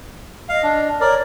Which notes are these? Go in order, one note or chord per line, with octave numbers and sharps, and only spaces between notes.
D#5 F5
D4
A#4 C#5 D5